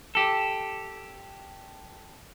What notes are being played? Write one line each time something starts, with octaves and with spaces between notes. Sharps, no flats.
G4 A4